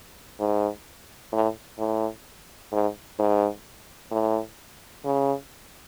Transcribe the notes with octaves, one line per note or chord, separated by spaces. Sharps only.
G#2
A2
A2
G#2
G#2
A2
C#3